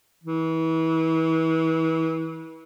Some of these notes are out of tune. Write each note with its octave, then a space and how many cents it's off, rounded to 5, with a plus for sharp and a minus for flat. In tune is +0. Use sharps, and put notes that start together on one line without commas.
E3 -30